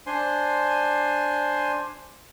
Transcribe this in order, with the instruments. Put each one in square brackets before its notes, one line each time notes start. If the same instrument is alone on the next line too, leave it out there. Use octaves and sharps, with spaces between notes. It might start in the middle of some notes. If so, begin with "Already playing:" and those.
[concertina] D4 C5 G#5 C6